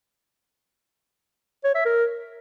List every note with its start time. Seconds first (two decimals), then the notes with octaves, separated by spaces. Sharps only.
1.64 C#5
1.74 E5
1.85 A#4